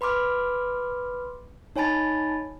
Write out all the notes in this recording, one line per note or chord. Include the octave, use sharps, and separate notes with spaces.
B4 B5 C6 D6 F6
D#4 C#5 G#5 A5 B5 A6